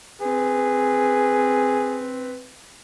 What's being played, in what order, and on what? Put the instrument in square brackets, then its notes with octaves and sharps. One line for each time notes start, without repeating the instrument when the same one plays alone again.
[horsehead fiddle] C4 B4 [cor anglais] G#4